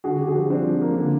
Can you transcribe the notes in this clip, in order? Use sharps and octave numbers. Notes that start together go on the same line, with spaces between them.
D3 F#4 G#4
D3 G4
F#4 G#4
F3
F3 C4 D4
F3
A#3
D3